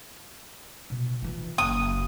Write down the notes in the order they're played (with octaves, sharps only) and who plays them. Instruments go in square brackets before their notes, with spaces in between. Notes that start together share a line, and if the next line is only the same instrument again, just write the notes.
[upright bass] B2
E3 F4
[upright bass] F#1 [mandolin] D#6